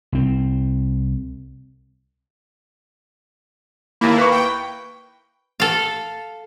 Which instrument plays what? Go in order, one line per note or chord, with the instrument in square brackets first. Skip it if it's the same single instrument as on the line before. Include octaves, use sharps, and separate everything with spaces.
[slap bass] C2 C4
[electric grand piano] D#2 B5 [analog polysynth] A#3 E4
[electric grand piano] B4 B5 C#6
[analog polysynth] G5
[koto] A4 F5